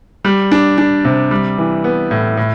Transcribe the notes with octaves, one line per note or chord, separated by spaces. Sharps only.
G3
D4
D4
C3
G3
E3
B3
A2
A2